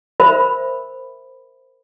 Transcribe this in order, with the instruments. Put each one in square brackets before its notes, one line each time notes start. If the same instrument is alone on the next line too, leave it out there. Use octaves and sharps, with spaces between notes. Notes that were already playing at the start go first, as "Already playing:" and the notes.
[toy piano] A#4 C5 E5 B5